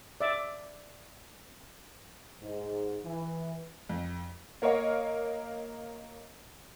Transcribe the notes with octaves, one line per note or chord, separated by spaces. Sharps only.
D5 E5
G#2
E3
F2
A#3 A#4 C#5 D#5 F5